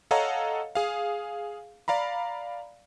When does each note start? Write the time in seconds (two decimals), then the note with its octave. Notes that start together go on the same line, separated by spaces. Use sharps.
0.11 A4 C#5 D#5 F5 F#5 A#5
0.75 G#4 F5
1.88 D5 F5 A#5 B5